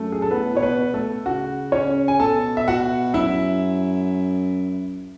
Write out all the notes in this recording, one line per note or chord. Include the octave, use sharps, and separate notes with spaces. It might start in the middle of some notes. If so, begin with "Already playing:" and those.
Already playing: F#2 A3
G#4
A4
A2 B3 B4
B2 C#5
B3 B4
B2
A3 A4
C#3 F#4
C#4 C#5
G#5
B2 A4 A5
E5
F#4 F#5
F#2 E4 E5